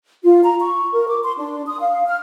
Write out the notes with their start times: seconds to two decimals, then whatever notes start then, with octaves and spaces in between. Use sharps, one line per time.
0.23 F4
0.44 A#5
0.60 C#6
0.93 A#4
1.08 D6
1.23 C6
1.38 D4
1.67 D#6
1.80 F5
2.07 F6